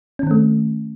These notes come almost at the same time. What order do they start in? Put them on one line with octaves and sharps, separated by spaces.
C#4 D#3 C4 A3